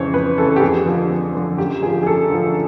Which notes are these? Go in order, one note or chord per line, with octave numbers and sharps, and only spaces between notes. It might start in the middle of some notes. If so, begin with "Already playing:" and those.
Already playing: F2 C#3 E3 C5 C#5
F2 B4
C#3 E3 A4
G4
F2 G#4
D3 F3
F2
D3 F3
F#2 G4
D3 F3 G#4
G#4
F#2 A4
D3 F3